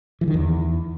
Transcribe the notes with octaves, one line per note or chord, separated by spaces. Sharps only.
E3
D#3
E2